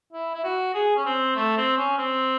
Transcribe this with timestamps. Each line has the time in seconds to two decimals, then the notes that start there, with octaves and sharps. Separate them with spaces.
0.13 E4
0.34 E4
0.44 F#4
0.74 G#4
0.96 C#4
1.05 C4
1.36 A3
1.57 C4
1.77 C#4
1.98 C4